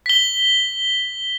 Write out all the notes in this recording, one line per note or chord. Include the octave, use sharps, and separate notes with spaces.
B6 G7